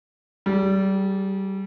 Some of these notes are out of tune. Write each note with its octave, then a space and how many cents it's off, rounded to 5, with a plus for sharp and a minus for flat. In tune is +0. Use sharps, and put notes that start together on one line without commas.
G3 -25 G#4 +5